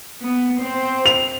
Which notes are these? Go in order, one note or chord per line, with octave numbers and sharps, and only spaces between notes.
B3
C4 C5
F7